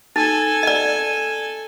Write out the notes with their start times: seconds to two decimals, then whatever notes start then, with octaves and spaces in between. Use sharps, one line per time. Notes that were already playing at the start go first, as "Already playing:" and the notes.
0.16 D#4 A4 G#5
0.63 D5 D#5